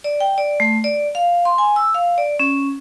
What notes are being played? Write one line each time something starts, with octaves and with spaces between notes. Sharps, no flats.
D5
G5
D5
A3
D5
F5
C6
G#5
E6
F5
D5
C#4